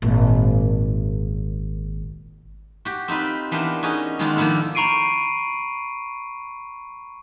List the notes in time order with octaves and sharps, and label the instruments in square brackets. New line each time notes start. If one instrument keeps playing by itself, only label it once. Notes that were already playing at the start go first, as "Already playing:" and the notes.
[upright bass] G#1 A#2
[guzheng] F#4 G4
C4 D#4 F4 B4
E3 B3 D4 A#4 C5
C#4 D#4 F#4 G#4 D#5
D#3 G#3 B3 D4 F4 F#4
D#3 F3 A#3 D4 E4 A4
[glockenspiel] A#5 B5 C#6 C7 D7 D#7